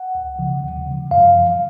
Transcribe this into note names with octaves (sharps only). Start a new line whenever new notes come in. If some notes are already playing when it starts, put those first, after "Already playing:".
Already playing: F#5
C#2
C#3 F3
D#2
C#3 F3
F#2 F5
F3